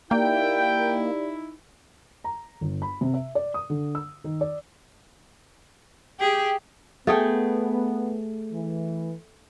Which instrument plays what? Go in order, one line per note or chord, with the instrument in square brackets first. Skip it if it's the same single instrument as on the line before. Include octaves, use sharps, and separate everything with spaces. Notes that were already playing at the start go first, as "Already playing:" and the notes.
[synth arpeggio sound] A#3 [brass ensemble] D#4 E4 [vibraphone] G4 D5 [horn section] G5
[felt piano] A#5
G1
B5
C3
E5
D5
D#6
D3
E6
D#3
D5
[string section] G4 [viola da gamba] G#4
[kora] A3 G#4 G5 [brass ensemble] B3
[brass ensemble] E3